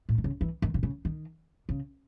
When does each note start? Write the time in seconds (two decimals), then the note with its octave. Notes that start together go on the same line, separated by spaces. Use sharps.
0.09 A2
0.18 D#3
0.24 C#3
0.41 E3
0.62 D#3
0.74 C3
0.83 C#3
1.05 D#3
1.69 C#3